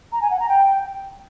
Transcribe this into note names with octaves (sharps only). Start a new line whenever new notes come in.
A#5
G#5
F#5
A#5
G5